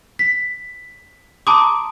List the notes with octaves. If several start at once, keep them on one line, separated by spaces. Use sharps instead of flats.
B6
A5 A#5 C6 D6 D#6